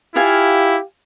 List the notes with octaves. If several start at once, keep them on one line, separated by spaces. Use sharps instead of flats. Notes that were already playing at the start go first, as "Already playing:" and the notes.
E4 F4 G4 F5 G#5